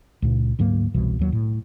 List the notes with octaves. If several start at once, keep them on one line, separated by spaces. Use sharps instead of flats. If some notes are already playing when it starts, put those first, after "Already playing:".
C#2 A#2
D2 G#2 F#3 A#3
G1 C2 B2 E3
D#2 F#3
A2